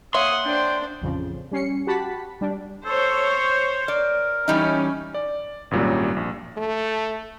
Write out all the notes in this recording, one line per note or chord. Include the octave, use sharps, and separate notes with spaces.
A#3 C#5 E5 F#5 C6 D#6
D4 C5 G5
A1 F2 C#3 F3
G3 C#4 C7 C#7
F#4 G4 F#5 A5 B5 B6
G3 D4
A4 C5 C#5
C#6
A#4 D5
E3 G3 C#4 D#4
D5
G#1 F#2 A#2 F#3 G3
A#1
A3